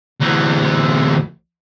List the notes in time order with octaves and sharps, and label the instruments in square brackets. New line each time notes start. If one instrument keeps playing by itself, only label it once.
[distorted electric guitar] D2 E3